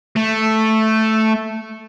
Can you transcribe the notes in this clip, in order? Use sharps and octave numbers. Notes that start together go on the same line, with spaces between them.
A3